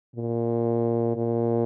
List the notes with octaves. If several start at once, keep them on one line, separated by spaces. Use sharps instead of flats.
A#2
A#2